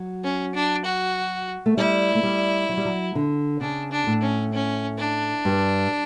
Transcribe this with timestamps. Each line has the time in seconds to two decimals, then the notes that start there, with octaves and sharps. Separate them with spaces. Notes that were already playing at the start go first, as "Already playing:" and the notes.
Already playing: F#3
0.24 C#4
0.54 D4
0.85 F#4
1.66 A3
1.77 G3 E4
2.15 A3
2.23 G3
2.69 F#3
2.77 G3
2.85 F#3
3.15 D3
3.61 C#3 D4
3.91 D4
4.07 A2
4.23 C#4
4.53 C#4
4.99 D4
5.45 G2